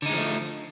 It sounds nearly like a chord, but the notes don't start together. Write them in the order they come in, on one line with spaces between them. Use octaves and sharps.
D3 D#4 G#3 F3 A3